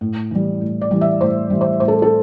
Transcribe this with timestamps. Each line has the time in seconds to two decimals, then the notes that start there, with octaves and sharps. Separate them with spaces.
0.01 A2
0.31 E3 G3
0.61 A2
0.81 D5
0.91 E3 G3
1.01 E5
1.21 A2 C5
1.50 E3 G3
1.61 C5
1.80 A2 C5
1.88 A4
2.02 A4